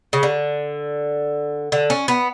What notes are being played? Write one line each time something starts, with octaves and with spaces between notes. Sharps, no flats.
C#3
D3
D3
C#4
B3